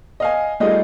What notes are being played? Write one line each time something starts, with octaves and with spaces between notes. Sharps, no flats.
D#5 F5 G#5
G3 A3 D#4 F4 G#4 D#5